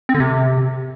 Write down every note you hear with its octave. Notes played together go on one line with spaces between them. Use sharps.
C4
D3
C3